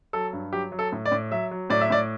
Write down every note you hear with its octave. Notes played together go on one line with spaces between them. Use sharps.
F#3 A4
G2
F#3 G4
F#3
A4
A2
D5
A2
F#3 E5
F#3
A2 D5
E5
A2 D5